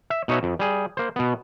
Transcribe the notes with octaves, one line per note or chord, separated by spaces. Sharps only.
E5
B2 D#4 F#4 C#5 E5
F2
G3 G#4
A#3 C5
B2 B3